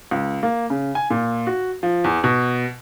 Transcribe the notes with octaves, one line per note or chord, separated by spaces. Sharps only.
C#2
A#3
C#3
G#5
A#2
F#4
F3
E2
B2